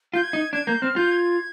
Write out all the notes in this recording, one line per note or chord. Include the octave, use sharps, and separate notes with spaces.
F4 G6
G#6
D#4
D4 G#6
A#3 G6
C4 F6
F4 G6
G#6